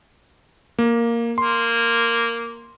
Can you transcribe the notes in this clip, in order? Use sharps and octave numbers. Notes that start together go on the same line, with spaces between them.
A#3
A#3 C6